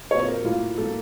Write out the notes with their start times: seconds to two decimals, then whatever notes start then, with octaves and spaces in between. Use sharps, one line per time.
0.11 A#2 F#3 C4 C#5
0.20 C5
0.28 A#4
0.44 A2 F#3 A#3 F4
0.78 A2 F#3 A#3 A4